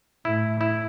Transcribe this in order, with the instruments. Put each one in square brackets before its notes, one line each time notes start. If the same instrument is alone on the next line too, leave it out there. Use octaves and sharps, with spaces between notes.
[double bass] A2 [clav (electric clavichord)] E4
[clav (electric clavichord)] E4